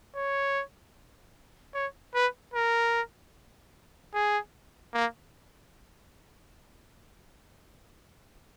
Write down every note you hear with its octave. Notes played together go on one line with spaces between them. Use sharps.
C#5
C#5
B4
A#4
G#4
A#3